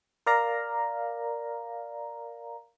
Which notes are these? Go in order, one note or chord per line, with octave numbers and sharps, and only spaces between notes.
A#4 D5 F5 A#5